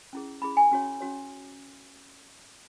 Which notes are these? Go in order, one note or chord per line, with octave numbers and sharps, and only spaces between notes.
C#4 E4 G#4
C#4 E4 G#4 B5
G#5
C#4 F#4 C#5
C#4 F#4 C#5